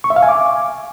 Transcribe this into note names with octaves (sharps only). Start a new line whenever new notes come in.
C#6
E5
F5
G#5
D6